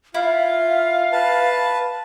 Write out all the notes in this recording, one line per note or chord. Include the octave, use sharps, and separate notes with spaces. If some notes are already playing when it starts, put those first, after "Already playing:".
E4 F4 F5
B4 A5